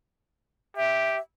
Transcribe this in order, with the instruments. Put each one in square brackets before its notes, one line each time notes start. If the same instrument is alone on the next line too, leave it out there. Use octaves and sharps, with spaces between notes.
[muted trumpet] G4 [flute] E5